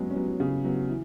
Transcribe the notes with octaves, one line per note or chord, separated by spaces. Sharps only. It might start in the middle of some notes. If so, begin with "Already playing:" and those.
Already playing: F#3 G#3 B3 C#4
C#4
F#3 B3
C#3
F#3 B3
E3